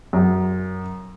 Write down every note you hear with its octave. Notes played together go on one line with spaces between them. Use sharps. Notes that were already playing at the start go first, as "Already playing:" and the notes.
F#2